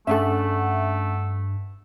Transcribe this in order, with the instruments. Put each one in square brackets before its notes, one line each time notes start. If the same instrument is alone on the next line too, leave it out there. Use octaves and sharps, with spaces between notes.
[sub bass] G2 [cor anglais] A3 [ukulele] C#4 D4 A4 [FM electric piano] E5 F#5